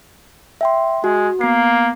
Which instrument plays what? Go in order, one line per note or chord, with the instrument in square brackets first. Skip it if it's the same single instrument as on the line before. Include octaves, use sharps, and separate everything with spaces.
[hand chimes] E5 G5 C6
[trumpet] G#3 [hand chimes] F#4
[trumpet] A#3 [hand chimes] B3 C7